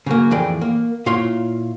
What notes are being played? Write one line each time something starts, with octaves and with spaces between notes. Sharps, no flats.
C#3 F#3 A#3
F2 A2 E3 G#4 D5 G5
A#3
A#2 E4 F4 C#5 C6